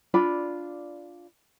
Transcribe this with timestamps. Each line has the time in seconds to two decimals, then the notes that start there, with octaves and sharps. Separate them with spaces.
0.14 D4 F4 D5 B5